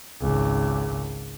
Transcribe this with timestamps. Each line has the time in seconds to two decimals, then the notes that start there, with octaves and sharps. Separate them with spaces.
0.21 G#1 C#2